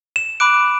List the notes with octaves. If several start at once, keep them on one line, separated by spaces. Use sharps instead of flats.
E7
B5 D6 F#6 D7